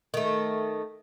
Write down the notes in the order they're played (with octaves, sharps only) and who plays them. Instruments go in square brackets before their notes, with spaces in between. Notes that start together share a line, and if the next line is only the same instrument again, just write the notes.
[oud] D#3 A3